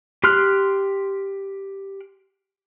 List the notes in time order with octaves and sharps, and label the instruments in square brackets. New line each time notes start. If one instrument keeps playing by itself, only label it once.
[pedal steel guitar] G4 C6 F6 F#6